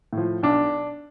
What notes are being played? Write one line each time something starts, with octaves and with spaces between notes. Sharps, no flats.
A2 F3
B1 D4